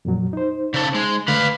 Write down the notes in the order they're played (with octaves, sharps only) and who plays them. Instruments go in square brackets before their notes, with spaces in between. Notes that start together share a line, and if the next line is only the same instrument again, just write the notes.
[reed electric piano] F2 A#2 F#3
D#4 C5
[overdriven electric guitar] C#3 A4
G#3
[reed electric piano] D3 A3 [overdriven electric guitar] B4 F5